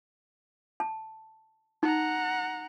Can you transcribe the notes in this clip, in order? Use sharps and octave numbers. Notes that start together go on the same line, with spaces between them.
A5
D#4 F#5 A#5